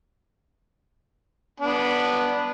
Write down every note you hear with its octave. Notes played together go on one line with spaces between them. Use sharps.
B3 D4